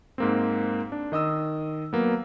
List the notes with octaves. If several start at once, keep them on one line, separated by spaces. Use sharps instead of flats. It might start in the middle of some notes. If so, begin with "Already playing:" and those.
G#2 A#3 C4
D4
D#3 D#5 D#6 E6
F#3 A#3 B3